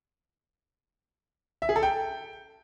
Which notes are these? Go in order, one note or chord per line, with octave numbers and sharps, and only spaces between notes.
E5
G#4
A4
G5